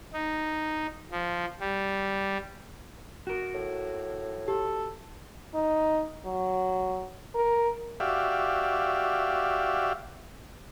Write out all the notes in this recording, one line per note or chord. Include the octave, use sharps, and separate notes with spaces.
D#4
F3
G3
F#4 A#4
A2
G4 A4
D#4
F#3
A#4
F#4 G4 D5 E5 F5